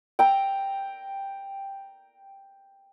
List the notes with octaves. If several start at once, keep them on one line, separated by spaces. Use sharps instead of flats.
G5 A#5